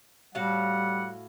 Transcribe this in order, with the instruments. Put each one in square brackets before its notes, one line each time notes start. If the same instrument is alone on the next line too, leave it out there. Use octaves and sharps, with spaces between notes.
[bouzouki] A2 F#4 F5 [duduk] G3 [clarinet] F#5